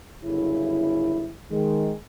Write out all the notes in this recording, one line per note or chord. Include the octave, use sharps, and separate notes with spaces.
G1 F#2 C#3 E4
D#3 G#3